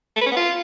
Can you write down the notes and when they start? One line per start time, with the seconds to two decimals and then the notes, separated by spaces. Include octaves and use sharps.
0.16 A3
0.21 B4
0.26 C#4
0.31 B3
0.37 F4